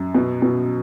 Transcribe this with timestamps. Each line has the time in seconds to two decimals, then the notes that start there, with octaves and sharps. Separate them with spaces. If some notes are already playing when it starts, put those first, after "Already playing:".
Already playing: F#2
0.14 B2
0.42 B2